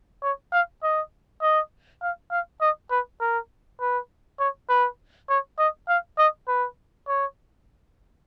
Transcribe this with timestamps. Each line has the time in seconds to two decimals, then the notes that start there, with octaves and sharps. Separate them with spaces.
0.23 C#5
0.52 F5
0.83 D#5
1.42 D#5
2.02 F5
2.31 F5
2.61 D#5
2.91 B4
3.20 A#4
3.80 B4
4.40 C#5
4.69 B4
5.29 C#5
5.59 D#5
5.88 F5
6.18 D#5
6.48 B4
7.08 C#5